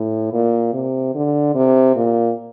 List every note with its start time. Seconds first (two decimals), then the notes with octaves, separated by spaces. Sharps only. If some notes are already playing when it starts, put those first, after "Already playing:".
Already playing: A2
0.32 A#2
0.73 C3
1.14 D3
1.55 C3
1.95 A#2